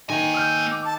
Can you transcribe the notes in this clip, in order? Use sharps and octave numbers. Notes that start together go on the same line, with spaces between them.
D#3 A#3 G#5
E6 F6 G6
D6
A5